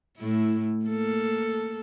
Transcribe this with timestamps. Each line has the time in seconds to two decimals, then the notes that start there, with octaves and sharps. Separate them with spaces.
0.18 A2 A3 E4
0.86 A#3 A4